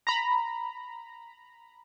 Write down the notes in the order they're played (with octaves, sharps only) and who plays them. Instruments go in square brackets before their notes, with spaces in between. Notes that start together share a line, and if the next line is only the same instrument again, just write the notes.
[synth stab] A#5 B5